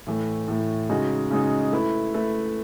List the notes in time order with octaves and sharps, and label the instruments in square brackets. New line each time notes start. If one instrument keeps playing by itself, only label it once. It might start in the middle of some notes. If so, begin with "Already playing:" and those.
[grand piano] A2 E3 A3
A2 E3 A3
C#3 G#3 D#4 F#4
C#3 G#3 D#4 F#4
A3 E4 B4
A3 E4 B4